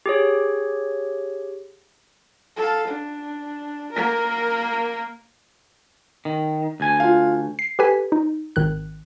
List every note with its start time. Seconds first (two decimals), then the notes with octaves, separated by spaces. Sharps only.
0.06 G4 G#4 C#5
2.57 A4 F5
2.87 D4
3.92 A#3 A#4
6.25 D#3
6.80 D2 G#5
7.00 F4 F5
7.59 C7
7.79 G4 A4 B4 G#5 B6
8.12 D#4
8.56 G#1 D#3 F#6